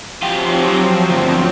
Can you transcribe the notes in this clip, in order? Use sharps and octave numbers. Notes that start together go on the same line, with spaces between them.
F3 F#3 C4 F4 G4
D2 G2